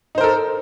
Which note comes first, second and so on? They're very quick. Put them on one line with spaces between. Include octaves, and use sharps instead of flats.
D#4 C5 A#4 A4